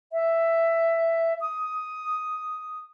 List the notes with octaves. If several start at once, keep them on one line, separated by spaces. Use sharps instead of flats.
E5
D#6